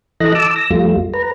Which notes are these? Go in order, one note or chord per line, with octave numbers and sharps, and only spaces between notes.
E3 A4 D#5 F#6 A#6
A5 D6 E6
E6 A#6
F2 G3 A3 F4
B4 A#5